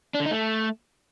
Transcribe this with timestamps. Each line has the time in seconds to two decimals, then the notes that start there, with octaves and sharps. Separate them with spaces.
0.14 D4
0.20 D3
0.26 D#4
0.31 A3